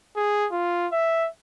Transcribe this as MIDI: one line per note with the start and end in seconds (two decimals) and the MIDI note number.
0.17 0.47 68
0.52 0.87 65
0.92 1.28 76